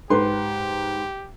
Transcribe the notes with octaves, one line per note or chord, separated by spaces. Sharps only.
G#2 G4 B4 C6